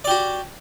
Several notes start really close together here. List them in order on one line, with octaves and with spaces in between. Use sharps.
D5 G4 F#4